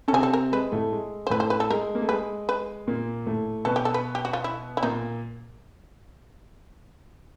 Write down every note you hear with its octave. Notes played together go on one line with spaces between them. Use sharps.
C#4 A4
C3 C4 G#4
A4
A#4
G#3 B4
A2 A3
G#3
C5
A2 A3 B4
C5
B4
A4
G#3 A#4
A#3
A3
G#3 B4
B4
A#2 A#3
A2 A3
B2 B3 A4
G4
A4
B4
G4
F#4
F4
E4
E4
A#2 A#3 D#4